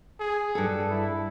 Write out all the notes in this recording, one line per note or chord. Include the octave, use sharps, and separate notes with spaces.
G#4
G2 A4
E4